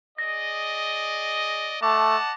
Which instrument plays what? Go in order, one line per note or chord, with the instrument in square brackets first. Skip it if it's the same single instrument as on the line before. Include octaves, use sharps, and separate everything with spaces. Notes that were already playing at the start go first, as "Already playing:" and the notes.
[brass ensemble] G#4 D5 D#5 [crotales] A#6
[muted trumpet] A3 [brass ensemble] D#5 F#5 A5 [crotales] D6